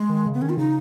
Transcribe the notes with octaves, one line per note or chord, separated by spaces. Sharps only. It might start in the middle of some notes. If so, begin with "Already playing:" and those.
Already playing: G#3
D#3
C#3
B3
D#3 C#4
F4
C#3 D#4